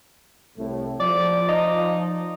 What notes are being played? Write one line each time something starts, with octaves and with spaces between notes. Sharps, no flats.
C2 A2
F3 D5
D#4